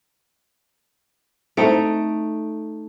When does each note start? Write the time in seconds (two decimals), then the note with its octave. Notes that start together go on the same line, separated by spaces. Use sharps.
1.57 A3 C4 D#4 E4 D7